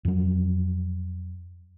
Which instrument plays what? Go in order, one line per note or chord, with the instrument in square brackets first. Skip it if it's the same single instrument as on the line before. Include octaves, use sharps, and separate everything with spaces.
[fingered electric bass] F2 F#3